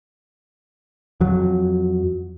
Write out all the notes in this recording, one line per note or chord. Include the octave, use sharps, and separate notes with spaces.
F2 F#3